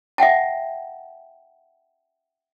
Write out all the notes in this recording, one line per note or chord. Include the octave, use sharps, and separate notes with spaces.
E5 F#5 G5 A5